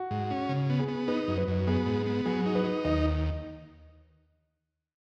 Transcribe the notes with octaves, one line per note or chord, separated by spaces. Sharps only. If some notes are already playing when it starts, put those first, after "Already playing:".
Already playing: F#4
G#2
C#4
C#3
B3
G#4
B3
D#4 B4
F#2
B4
F#2
B3 G#4
G#2
B3
F#3 G#4
D#4
B4
D#4
D#2 D#5